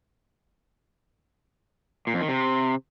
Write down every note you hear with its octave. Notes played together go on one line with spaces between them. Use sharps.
A#2
F2
D#3
C3